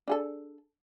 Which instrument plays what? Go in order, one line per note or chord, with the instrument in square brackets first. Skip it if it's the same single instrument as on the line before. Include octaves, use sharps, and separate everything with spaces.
[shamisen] D4 G#4 A4